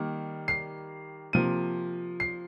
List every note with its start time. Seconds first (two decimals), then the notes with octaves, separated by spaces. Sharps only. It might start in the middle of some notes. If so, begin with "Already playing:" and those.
Already playing: D#3 G3 A#3
0.48 C7
1.33 C3 F3 A#3 D#7
2.20 C7